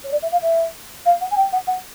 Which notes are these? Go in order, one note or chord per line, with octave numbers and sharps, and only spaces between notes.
C#5
D5
E5
F5
E5
F5
F#5
G#5
G5
F#5
F#5